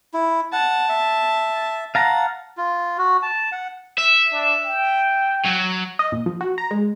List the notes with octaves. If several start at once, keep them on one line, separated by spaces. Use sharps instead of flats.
E4
F#5 A5
E5
F5 F#5 A5 A#5
F4
F#4
A5
F#5
E5
D4
G5
F#3
D#5
A#2
F3
F#4
A#5
G#3